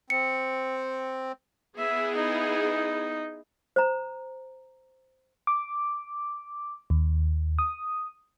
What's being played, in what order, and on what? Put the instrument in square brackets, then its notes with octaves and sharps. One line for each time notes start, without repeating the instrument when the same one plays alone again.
[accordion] C4 [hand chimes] C#7
[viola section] B3 E4 G#4 [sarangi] E5
[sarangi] D#4
[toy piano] C5 A#5
[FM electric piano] D6
D#2
D#6